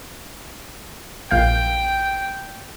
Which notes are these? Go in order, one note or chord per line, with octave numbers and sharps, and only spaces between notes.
A#1 F5 G5 G6